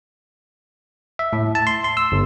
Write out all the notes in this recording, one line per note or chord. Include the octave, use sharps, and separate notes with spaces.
E5
A2
A5
C6
C6
E6
G1